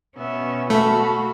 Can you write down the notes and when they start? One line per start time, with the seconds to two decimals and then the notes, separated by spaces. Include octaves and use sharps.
0.17 B2 B3 C#4 E5
0.70 A3 F#4 F5 A5 B5